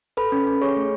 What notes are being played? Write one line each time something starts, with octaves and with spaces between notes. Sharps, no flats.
A4 B4 B5
C#4
C#4
G#4 C#5 C#6
A3